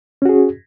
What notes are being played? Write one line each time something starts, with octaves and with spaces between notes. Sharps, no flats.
C#4 F#4 G#4